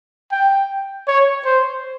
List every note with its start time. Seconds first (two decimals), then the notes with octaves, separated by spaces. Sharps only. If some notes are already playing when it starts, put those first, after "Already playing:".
0.32 G5
1.08 C#5
1.45 C5